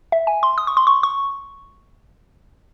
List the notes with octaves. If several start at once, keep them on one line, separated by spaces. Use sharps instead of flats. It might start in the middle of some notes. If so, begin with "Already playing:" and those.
E5
G#5
C6
D#6
C#6
C6
C#6
C#6